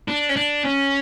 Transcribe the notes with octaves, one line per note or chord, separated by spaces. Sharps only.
D4
C#4
D4
C#4